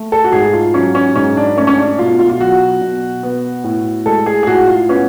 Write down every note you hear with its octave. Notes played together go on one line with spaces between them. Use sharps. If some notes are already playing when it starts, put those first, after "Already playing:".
Already playing: A3
A4
F#4
G#2 G#4
F4
F#3 C#4
C#4
G#2 C#4
D4
A3 C#4
C#4
D4
B2 F4
F4
F4
F#3 F#4
B2
B3
A2
G#3 A4
G#4
G#4
A2 F#4
F4
B3 C#4